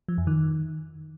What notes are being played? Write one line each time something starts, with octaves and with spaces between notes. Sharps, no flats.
F3
F2
D#3